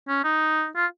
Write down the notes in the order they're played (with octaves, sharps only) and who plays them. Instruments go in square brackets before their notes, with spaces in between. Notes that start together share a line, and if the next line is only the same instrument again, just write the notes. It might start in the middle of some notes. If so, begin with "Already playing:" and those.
[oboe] C#4
D#4
F4